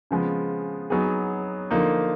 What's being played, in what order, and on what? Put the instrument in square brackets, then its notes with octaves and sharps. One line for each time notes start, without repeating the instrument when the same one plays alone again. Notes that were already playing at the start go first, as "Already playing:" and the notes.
[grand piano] C#3 F3 G#3 B3
F#3 B3 D#4 G#4
D3 F3 A#3 D#4